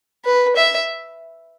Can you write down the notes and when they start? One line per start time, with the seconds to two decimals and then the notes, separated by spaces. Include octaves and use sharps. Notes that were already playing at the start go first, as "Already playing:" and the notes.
0.25 B4
0.56 E5